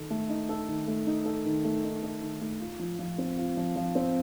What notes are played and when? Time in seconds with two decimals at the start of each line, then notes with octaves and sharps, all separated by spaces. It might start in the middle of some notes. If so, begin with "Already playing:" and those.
Already playing: D#3 D#4 A4
0.10 A3
0.29 D#4
0.49 A4
0.68 D#3
0.87 A3
1.06 D#4
1.26 A4
1.45 D#3
1.64 A3
1.84 D#4
2.03 A4
2.22 D#3
2.41 A3
2.60 F4
2.79 F3
2.99 F3
3.18 C4
3.38 F4
3.57 F3
3.76 F3
3.95 C4